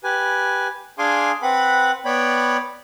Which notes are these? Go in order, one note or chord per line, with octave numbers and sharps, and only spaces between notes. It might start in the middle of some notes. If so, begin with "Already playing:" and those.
G4 B4 G#5
D4 G#4 F5 G#5 C6 D6
C4 B4 F#5 B5
B3 C#5 D5 G5 B5